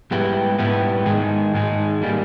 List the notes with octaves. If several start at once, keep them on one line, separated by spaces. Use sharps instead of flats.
G#2 G3 B3 E4 G4
G#2 G3 B3 E4 G4
G#2 D#3 G#3 D#4 G#4
G#2 D#3 G#3 D#4 G#4
D#3 G3 A#3